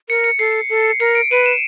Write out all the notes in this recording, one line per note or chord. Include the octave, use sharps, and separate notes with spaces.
A#4 C#7
C#7
A4 C7
A4
A#4 C#7
D7
B4 D#7
E7